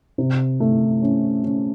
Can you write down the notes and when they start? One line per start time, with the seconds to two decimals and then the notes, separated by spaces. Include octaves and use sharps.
0.18 C3
0.60 A3
1.02 C#4
1.44 C#4